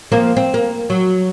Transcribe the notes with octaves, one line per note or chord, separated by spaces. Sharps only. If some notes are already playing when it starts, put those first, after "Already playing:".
F3 A#3 C4
C4
A#3
F#3